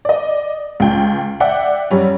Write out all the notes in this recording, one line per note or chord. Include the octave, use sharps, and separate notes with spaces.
D5 D#5
C#2 G5
D5 E5 F#5 G5
F#2 G3 C#4